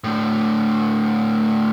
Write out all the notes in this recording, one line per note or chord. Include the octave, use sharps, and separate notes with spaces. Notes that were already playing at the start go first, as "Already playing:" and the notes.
A2 D3